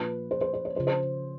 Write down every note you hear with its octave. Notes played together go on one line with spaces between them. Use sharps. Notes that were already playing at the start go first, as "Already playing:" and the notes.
Already playing: A#2 F3 B4
C5
C5
C5
C#5
C#3 F3 C5
C5